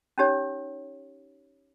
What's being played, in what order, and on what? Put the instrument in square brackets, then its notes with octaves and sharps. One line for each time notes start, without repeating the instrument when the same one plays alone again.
[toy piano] C#4 D#4 G4 C#5